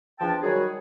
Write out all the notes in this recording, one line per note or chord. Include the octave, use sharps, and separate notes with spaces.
E2 F3 D4 G5 A5
D#3 F#3 G3 F#4 G#4